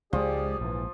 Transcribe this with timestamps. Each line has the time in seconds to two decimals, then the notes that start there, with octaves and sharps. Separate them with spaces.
0.13 C#2 F3 G#3 G4 G#4 D5
0.61 A#1 G#2 E3